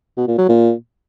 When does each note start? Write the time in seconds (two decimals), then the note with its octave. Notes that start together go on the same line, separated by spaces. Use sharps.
0.17 B2
0.28 A#2
0.38 F#3
0.49 A#2